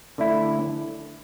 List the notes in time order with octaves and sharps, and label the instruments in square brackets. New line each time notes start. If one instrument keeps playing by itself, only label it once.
[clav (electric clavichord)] D3 A3 E4